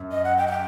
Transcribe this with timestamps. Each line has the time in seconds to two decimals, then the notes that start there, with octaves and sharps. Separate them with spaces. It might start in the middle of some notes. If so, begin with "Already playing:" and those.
Already playing: F#2
0.12 D#5
0.24 F#5
0.37 G5
0.47 F#5
0.51 G5